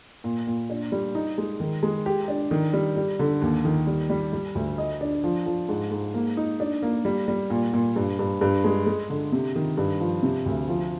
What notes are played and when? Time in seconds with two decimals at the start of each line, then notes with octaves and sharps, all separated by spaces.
0.24 A#2
0.47 A#2
0.70 D4
0.92 G3
1.15 D#4
1.38 G#3
1.60 D#3
1.83 G#3
2.06 G4
2.28 D4
2.51 D#3
2.73 G3
2.96 G3
3.19 D3
3.42 D#2
3.65 D#3
3.87 G3
4.10 G3
4.33 G3
4.55 D2
4.78 D#5
5.01 D4
5.24 F3
5.46 F3
5.69 G#2
5.91 G#2
6.14 A#3
6.37 D#4
6.60 D4
6.83 A#3
7.05 G3
7.28 G3
7.50 A#2
7.73 A#2
7.96 G2
8.19 G2
8.41 G2
8.64 G#3
8.86 G#3
9.10 D3
9.32 C3
9.56 D#3
9.78 G2
10.01 F3
10.22 C3
10.46 D2
10.68 F3